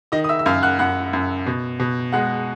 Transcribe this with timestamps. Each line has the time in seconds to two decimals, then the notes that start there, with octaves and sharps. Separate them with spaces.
0.12 D#3 D#5 D#6
0.24 D#6
0.29 E5 E6
0.39 E6
0.46 F#2 F5 F6
0.63 F#5 F#6
0.79 F#2 F#5 F#6
1.13 F#2
1.47 B2
1.80 B2
2.12 G#3 F#5 F#6